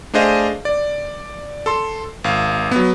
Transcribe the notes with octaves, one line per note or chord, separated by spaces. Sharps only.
A3 D4 G#4 C5 D#5 F5
D5
A4 C6
G#1 F5
F#3 B3